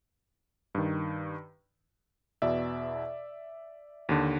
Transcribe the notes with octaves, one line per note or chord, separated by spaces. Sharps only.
G2 D#3
E2 B2 D5 E5
D#2 D3